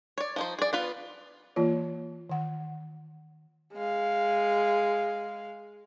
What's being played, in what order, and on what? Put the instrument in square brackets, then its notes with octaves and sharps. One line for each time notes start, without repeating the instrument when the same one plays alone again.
[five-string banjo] C#5 D5
F3 D#4 C5
G#4 D5
B3 F4 B4
[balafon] E3 A#3 F4 C#5
D#3 F#5
[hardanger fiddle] G#3 F5